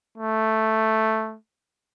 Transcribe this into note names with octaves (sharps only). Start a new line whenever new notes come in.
A3